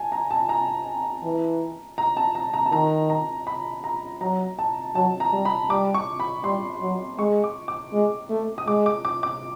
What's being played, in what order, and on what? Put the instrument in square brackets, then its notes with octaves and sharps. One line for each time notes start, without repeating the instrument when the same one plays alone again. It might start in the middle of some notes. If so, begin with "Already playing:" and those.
Already playing: [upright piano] G#5 A5
A#5
A5
A#5
[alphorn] E3
[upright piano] A#5
A5
A#5
A#5
A5
[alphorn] D#3 [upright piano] A#5
[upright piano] A#5
B5
A#5
[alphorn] F#3 [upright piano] A#5
[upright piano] A5
[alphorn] F#3 [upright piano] A5
[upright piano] A#5
[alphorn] G3
[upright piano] B5
[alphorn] G3 [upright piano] D6
[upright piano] C#6
B5
[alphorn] G3 [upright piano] C6
[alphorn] F#3
[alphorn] G#3 [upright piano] C#6
[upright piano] D6
D6
[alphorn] G#3
A3
[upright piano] D#6
[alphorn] G#3 [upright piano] D6
[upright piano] D6
D6
D6